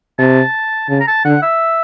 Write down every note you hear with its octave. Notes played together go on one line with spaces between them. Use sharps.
C3 A5
C#3 A5
A#5
A5
D3 F#5
E5